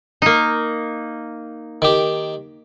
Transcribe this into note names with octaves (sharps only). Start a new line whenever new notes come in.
A#3 D#4
D#3 G4